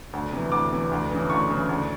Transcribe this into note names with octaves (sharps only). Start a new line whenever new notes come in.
D2
C3 E3
D2 D6
C3 E3
D2
C#3 E3
D2 C#6
C#3 E3
D2